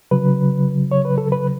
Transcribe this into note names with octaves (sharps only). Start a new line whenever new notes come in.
C#3 F#3 B4
C#5
B4
A4
B4